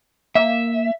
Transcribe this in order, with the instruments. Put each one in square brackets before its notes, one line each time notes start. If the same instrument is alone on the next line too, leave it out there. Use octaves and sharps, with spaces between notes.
[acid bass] A#3 [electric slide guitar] E5